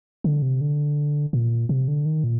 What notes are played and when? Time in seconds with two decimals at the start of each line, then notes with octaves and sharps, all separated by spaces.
0.24 D3
0.42 C3
0.61 D3
1.33 A#2
1.69 C3
1.88 D3
2.05 D#3
2.24 A#2